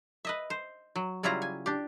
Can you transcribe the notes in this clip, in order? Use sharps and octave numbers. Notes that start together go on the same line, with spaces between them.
B4 D#5 E5
C5
F#3
C#3 F#3 G3 E4 F4 A#5
G#5
D4 G4